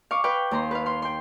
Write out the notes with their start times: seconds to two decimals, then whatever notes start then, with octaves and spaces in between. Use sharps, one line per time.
0.11 F5 C#6 D6
0.24 B4 F5 G5
0.51 D#2 A#5 C6
0.71 B4 F5
0.86 F5 C6
1.02 G5 C6